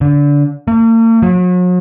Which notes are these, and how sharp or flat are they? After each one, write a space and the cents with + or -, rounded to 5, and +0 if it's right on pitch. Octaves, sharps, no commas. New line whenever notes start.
D3 -25
A#3 -45
F#3 -40